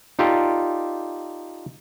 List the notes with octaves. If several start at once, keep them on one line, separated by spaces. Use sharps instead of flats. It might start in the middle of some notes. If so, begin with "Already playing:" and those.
D#4 F4 G4 A4 D5